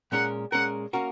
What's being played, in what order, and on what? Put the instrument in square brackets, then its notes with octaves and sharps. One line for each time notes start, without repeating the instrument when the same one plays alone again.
[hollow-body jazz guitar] A#2 G#3 C#4 A#4 [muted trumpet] F#5
[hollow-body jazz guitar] A#2 G#3 C#4 A#4 [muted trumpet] F#5
[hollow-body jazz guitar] A#3 C#4 F#4 A#4